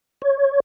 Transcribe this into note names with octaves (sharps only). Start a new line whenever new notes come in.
C#5